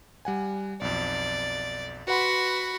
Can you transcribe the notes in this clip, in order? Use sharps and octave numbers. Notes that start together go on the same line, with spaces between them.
G3 F#5 G#5
B1 F2 D5
F#4 B4 F#5 B5 C6